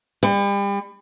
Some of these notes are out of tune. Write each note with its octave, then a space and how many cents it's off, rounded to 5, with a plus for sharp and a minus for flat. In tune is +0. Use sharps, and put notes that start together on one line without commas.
G3 +35